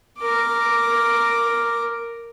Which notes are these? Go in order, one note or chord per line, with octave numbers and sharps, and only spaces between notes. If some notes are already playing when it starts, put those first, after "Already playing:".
A#4 D6